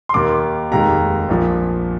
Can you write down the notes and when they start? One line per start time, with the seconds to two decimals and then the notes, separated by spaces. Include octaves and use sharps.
0.09 C6
0.14 D#2 D#3 A#3 D6
0.72 F1 D#2 D#3 G#3 A#5
1.29 A#1 A#2 F3